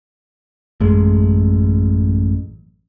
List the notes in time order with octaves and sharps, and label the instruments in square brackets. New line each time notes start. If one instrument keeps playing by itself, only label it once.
[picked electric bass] A1 F#2 G#3